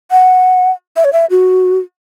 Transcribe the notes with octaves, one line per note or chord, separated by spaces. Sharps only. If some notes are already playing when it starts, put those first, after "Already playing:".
F#5
E5
C#5
E5
F#4